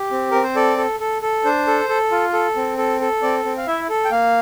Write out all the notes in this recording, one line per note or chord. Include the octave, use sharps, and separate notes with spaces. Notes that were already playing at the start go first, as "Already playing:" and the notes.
Already playing: G4
C4
C4 A#4
C5
A4 D5
A4
A4
A4
D4 C5
A4
A4
F4
A4
C4
A4
A4
C4 D5
C4
F5
E4 E5
A4
G5
A#3 F5